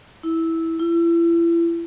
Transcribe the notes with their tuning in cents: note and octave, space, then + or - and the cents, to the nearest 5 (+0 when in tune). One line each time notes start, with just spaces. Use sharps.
E4 -10
E4 +35